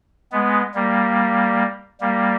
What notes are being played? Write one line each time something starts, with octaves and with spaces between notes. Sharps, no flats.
G#3 B3
G3 A#3
G3 A#3